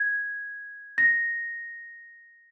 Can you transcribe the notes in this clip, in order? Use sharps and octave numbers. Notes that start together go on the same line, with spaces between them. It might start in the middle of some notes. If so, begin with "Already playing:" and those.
Already playing: G#6
A#6